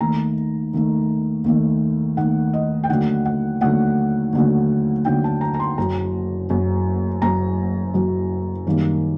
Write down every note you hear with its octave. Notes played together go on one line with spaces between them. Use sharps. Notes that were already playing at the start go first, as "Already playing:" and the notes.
D#2 D#3 A3 A#5
D#2 D#3 A3
D#2 D#3 A3
D#2 D#3 A3 F#5
D#5
G5
D#2 D3 F#3 A3 F#5
F#5
D#2 D3 F#3 A3 F#5
D#2 D3 F#3 A3
D#2 D3 F#3 A3 G5
A5
A#5
A#5
C6
F#1 F#2 F#3 A#5
F#1 F#2 F#3
F#1 F#2 F#3 A#5
F#1 F#2 F#3
F#2 D#3 G3 A#3